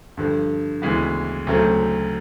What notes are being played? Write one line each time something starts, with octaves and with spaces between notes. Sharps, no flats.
G2 D3 F3
D2 C#3 E3 G#3 B3
D2 C#3 F#3 A3 C4